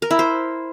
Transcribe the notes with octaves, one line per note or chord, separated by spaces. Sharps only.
A#4
E4
C5